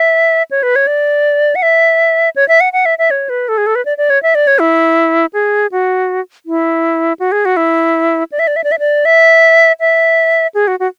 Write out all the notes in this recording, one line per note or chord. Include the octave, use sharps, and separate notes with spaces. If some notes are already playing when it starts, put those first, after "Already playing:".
Already playing: E5
C#5
B4
C#5
D5
F#5
E5
C#5
E5
F#5
F#5
E5
E5
C#5
B4
A4
G#4
A4
B4
D5
D5
C#5
E5
D5
C#5
E4
G#4
F#4
E4
F#4
G#4
F#4
E4
D5
E5
D5
E5
D5
E5
D5
E5
E5
G#4
F#4
F#4